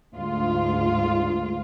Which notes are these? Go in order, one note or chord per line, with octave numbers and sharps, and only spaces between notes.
D2 G#2 F4